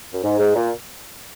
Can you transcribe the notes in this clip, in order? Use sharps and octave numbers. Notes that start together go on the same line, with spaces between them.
F#2
G#2
G#2
A#2